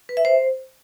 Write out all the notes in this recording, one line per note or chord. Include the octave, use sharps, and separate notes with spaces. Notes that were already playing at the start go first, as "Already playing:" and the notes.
B4
E5
C5